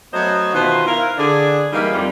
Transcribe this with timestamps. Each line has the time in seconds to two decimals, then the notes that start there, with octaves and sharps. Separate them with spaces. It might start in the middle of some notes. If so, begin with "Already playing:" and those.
0.13 F#3 A3 B3 C#4 C5 D#5
0.53 B2 D#3 E3 F4 B4 C5
0.86 E4 A#4 F5
1.17 D3 D4 G#4
1.73 E3 G3 G#3 A#3 D#4 E4
1.91 F2 G3 F4